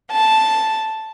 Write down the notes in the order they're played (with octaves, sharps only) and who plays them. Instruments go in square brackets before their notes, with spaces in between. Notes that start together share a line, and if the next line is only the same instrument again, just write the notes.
[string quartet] A5